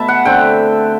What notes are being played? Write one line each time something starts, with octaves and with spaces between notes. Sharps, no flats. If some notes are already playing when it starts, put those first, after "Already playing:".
Already playing: B2 A3 E4 E5 A5 B5
F#5
D3 A3 C4 G5